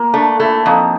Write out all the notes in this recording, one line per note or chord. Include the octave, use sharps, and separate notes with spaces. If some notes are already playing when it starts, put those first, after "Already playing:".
Already playing: A#3
A3 D4
A3 E4
F2 D#4